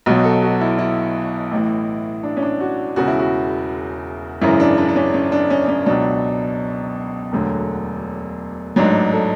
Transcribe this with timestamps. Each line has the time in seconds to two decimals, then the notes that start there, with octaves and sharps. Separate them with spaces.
0.06 B1 B2 F#3 F#4
0.24 A4
0.42 F#4
0.61 E4
0.79 E4
1.51 A1 A2 E3
2.23 D4
2.37 C#4
2.42 D4
2.60 F#4
2.96 E1 E2 C#3 F#4
3.08 E4
3.19 F#4
4.41 G#1 F#2 C#3 E3 E4
4.60 D4
4.78 D4
4.89 D4
4.96 C#4
5.14 C#4
5.32 D4
5.50 C#4
5.68 C#4
5.86 C#2 B2 F#3 D4
7.32 E1 D2 D3 F#3
8.76 A1 G#2 F#3 D4
9.13 A4